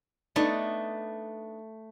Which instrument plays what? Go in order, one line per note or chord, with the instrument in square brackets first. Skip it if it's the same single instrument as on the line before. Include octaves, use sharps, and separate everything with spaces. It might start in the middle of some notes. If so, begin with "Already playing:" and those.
[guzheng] A3 [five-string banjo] B3 D4 D#4